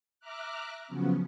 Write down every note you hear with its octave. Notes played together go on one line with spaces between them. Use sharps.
E5 A#5 D6 F6 F#6
C#3 F3 F#3 B3 C#4